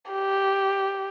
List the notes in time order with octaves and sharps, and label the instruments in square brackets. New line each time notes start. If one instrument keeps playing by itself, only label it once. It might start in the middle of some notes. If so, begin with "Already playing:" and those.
[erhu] G4